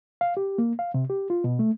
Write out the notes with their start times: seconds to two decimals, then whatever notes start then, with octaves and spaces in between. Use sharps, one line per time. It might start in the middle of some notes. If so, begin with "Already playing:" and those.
0.21 F5
0.37 G4
0.58 A#3
0.79 F5
0.94 C3
1.10 G4
1.30 F4
1.44 B2
1.59 A3